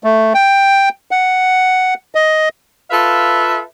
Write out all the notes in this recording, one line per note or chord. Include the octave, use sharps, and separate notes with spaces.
A3
G5
F#5
D#5
F4 A4 B4 E5 F5